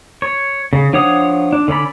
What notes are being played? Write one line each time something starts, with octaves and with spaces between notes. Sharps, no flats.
C#5
C#3
F3 D4 C#5 F#5 D#6
D4
D3 C#4 D5 B5